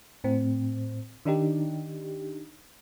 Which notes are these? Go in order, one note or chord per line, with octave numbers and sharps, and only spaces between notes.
A2 C4
D#3 D4 D#4 G4